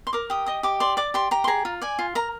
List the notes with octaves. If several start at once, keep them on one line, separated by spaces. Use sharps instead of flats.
C6
A#4 D6
G4 D#6
D#5 D#6
G4 D6
D5 C6
D5 D6
G4 C6
G4 A#5
C6
G#4 A#5
F4
D5 G#5
F4
A#4 A#5